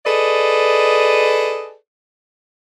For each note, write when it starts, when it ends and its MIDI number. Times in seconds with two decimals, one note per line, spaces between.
0.06 1.75 68
0.06 1.75 69
0.06 1.75 71
0.06 1.75 74
0.06 1.75 75